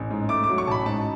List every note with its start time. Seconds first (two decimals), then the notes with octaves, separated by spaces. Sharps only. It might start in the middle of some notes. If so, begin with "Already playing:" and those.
Already playing: A1
0.10 G#2
0.29 A3 D6
0.44 D6
0.49 F#3
0.58 C#6
0.67 A1 A5 B5
0.86 G#2 A5